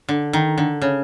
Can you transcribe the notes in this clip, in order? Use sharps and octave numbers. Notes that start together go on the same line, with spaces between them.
D3
D#3
D3
C#3